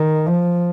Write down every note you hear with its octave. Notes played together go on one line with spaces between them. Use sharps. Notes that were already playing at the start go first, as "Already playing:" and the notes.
Already playing: D#3
F3